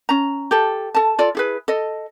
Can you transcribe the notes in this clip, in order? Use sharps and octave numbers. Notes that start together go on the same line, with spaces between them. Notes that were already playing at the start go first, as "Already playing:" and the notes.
C#4 A#5
G4 A4
A4 A5
F4 A4 D5
E4 G#4 B4
A4 D#5